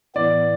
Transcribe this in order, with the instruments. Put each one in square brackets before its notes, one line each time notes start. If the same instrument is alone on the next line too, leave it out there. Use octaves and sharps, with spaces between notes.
[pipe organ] A2 E3 B3 [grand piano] D5